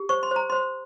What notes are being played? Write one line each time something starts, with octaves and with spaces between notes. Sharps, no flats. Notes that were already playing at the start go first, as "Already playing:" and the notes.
Already playing: G4
C5 C#6
C6
C5 A#5
C5 C6